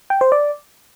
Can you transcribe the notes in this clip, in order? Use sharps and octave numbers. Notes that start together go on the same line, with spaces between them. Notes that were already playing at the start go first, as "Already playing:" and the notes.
G5
C5
D5